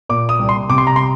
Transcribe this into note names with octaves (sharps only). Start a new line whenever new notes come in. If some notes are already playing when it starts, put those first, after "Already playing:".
A#2 D6
D#6
C2
C6
C3 D6
C6
A#5
C6